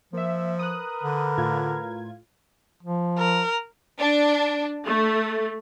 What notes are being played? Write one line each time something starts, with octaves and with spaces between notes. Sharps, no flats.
F3 A#3 E5
A#4 B4 D#6 F#6
D3
A2 F4 G#6
F3
A#4
D4
A3